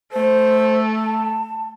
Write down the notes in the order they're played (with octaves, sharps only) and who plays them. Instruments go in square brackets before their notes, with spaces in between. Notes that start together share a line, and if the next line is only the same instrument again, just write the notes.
[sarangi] A3 [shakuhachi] C5
[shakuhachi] A5